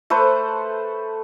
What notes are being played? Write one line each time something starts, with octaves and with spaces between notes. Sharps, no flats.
A3 A4 B4 C5